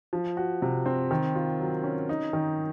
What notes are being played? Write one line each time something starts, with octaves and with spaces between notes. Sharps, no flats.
F3
F#4
C3
C4
D#3
F4
F#3
C#4
D#4
D#3